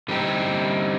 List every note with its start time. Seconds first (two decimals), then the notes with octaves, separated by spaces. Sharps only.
0.08 D3 G3 C4 D#4 G4